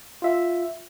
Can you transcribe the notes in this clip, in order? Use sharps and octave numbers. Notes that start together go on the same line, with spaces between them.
F4 E5